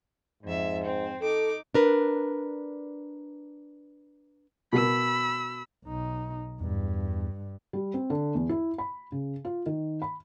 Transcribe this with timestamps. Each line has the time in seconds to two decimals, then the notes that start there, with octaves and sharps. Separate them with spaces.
0.43 F2 G#2 E5
0.84 C4
1.22 D#4 A4 D6
1.74 D4 A#4 B4
4.73 B2 A#4 B5 E6
5.84 B1 D#4
6.61 E2 G2
7.73 G3
7.94 C4
8.10 D3
8.35 E2
8.49 E4
8.78 B5
9.12 C#3
9.45 F4
9.66 D#3
10.02 B5